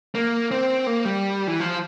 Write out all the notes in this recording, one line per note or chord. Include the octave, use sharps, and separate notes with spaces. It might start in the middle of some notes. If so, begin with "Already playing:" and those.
A#3
C4
A#3
G3
E3
F3